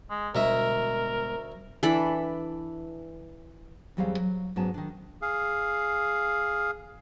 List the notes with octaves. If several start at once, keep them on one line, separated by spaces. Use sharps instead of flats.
G#3
D2 B2 G3 G#3 A#4 D#5 E5
E3 D4 A4 B5
E2 F#3 G3 C4 G#4 F5
F#3
G#2 F#3 B3 C#4 A5
D#3 D4
G#4 F5